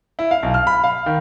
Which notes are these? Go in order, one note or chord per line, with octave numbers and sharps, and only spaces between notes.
E4
F5
B1
F6
B5
F5
D#3